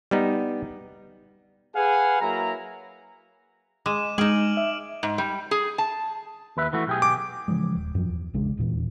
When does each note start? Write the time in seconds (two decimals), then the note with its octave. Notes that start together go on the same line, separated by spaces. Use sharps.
0.11 G3 B3 D#4
1.76 G#4 B4 F5 F#5 G#5
2.21 F#3 A#3 E4 A#5
3.86 G#3 D6 D#7 E7
4.18 G#3 D#4 G#4 F6 D7 F#7
4.57 E5
5.03 G#2
5.18 G3
5.51 G#4
5.78 A5
6.57 D#2 B4 E5
6.73 E3 A3 F#4
6.87 B1 G4 G#4
7.02 D6
7.48 C#3 E3 F3 G#3
7.75 D#1
7.95 F#2 F3
8.09 E2
8.34 A#1 C#3 G#3 D4
8.57 D#1 E2 A#2 E3